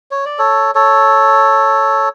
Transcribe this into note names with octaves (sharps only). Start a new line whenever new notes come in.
C#5
D5
A4 C#5
A4 C#5